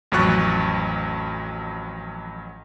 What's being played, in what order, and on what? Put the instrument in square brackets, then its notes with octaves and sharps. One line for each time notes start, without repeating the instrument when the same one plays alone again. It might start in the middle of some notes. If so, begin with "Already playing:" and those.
[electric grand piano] A1 F2 F#3 C#6 F#6 A6